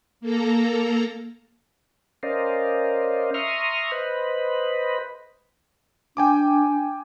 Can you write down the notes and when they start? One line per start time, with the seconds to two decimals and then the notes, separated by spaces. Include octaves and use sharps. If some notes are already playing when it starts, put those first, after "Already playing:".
0.21 A#3 A4 A#5
2.23 C#4 A#4 C5 D5 D#5 F5
3.34 E5 A#5 C6 C#6 D#6 F6
3.92 B4 C5 D#5 B5
6.17 D4 G5 G#5 D6